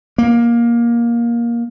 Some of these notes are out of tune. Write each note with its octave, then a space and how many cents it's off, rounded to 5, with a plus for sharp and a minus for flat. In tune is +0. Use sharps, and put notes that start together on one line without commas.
A#3 +15